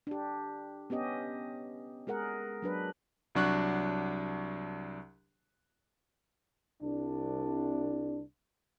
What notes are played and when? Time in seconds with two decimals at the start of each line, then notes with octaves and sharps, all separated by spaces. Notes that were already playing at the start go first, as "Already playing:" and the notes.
0.07 D4 G4
0.90 B3 C#4 G4 D#5
2.07 G#3 G#4 A#4 F#5
2.62 F#3 D4 B4
3.35 C2 F#3 D4 C#6 F#6
6.83 C2 D4